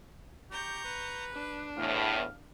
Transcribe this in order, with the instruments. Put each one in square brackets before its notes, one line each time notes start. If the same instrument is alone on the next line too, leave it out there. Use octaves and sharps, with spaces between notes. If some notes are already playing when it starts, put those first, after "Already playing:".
[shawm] G4 [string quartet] A#5 C#6 G6
[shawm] B4
[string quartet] D4
[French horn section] E2 A2 [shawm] F5